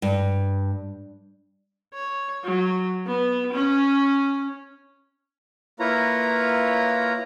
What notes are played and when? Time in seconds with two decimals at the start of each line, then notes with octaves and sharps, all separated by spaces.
0.02 G2
1.94 C#5
2.44 F#3
3.07 B3
3.54 C#4
5.80 A#3 E4 F4 B4 C#5 A#5